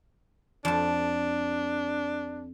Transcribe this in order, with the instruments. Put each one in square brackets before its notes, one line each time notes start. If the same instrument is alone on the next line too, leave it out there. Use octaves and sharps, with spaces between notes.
[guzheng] F2 A5 [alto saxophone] D4